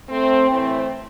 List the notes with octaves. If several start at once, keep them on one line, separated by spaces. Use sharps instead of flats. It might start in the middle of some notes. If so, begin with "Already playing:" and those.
A3 C4
A2 E3 A3 C4